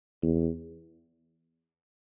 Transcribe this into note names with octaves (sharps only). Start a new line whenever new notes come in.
E2